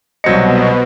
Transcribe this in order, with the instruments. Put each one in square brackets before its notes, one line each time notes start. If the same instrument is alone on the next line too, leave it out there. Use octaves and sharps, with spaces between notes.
[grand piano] C2 F#3 C#7 [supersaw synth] B2 [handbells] C5 D#5